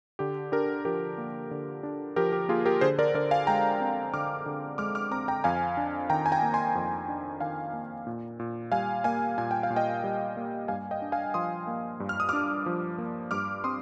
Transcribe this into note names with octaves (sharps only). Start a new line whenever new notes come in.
D3 G4
D4 G4 A#4
F3 G4 A#4
A#3
D3
D4
F3 G4 A#4
G4
A#3 F4 G#4
G4 A#4
D3 G#4 C5
A#4 D5
D3 A#4 D5
F5 G#5
G#3 G5 A#5
C4
D3 D6 F6
D3
G#3 D6 F6
D6 F6
C4 A#5 D6
G5 A#5
F2 F5 G#5
D4
D#3 G5 A#5
G#5
G5 A#5
A#3
G#5 C6
F2
D4
D#3 F5 G#5
A#3
A#2
A#2
G3 F5 G#5
A#3 F5 G#5
A#2 G#5
G5
F5
A#2
D#5 G5
G3
A#3
G2 F5 G#5
D#5 G5
D4
F5 G#5
F3 C6 D#6
A#3
G2
F6
D#6
D4 D6 F6
F3
A#3
G2 D6 F6
C4 C6 D#6